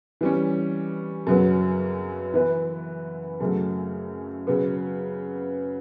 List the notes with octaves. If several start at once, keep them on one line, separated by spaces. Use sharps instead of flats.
E3 G3 C#4
F#2 C#3 F#3 B3
E3 B3 E4 B4
F#2 C#3 F#3 A3
C#3 F#3 B3